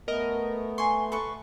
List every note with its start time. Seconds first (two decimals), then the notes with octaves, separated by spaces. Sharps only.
0.08 A3 B3 A#4 D#5
0.78 G#5 C6 C#6
1.12 A4 B4 C#6